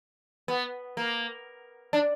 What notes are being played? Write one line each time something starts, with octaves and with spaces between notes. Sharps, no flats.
B3
A#3
D4